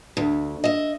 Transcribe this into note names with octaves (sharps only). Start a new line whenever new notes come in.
D2
D#5 E5